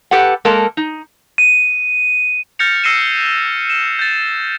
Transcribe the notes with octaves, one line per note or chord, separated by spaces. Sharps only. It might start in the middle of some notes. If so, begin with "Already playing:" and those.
G4 A4 B4 F#5
G#3 A#3 A4 A#4
D#4
D#7
F6 G6 A6 A#6 C#7 F7
E6 A#6 C7 C#7 D#7 E7
E7
G6 A6